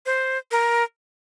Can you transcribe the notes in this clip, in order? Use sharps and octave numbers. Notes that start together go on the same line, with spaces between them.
C5
A#4